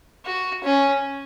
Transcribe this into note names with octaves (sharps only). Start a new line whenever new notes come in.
F#4
C#4